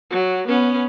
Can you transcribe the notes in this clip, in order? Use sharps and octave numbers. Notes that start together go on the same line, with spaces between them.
F#3
B3 C#4